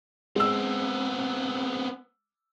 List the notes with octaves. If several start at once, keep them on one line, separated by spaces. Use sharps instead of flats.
G#3 B3 C4 E6